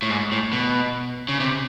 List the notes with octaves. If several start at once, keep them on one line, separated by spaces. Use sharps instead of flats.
A2
G#2
A2
B2
C#3
C3